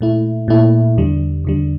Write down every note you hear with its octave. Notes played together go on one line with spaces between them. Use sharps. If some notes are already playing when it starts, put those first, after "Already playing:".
A#2 A3 E4
A#2 A3 E4
E2 D3 G3
E2 D3 G3